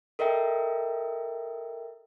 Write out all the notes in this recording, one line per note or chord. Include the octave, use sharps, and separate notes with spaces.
A4 A#4 D#5 E5 G5